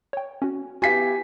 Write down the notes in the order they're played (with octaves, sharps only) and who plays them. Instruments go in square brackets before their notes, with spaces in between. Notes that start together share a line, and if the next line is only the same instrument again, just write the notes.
[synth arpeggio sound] C#5 G5
C#4 F#4
[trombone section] B3 E4 G4 [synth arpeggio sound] F#4 F5 [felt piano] G#5 B6